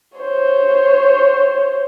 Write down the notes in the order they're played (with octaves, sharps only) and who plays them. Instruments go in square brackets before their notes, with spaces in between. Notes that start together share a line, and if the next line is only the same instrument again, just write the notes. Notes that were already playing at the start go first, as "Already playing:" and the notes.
[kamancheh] C5 C#5